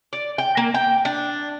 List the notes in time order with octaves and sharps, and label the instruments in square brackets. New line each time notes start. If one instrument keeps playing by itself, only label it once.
[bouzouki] D5
G5
A#3
G5
D4